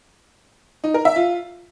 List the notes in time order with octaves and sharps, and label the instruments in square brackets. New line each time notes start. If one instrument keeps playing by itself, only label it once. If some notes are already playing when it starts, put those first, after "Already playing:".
[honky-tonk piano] D#4
A#4
E5
F4